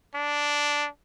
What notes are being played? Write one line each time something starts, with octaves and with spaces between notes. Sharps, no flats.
D4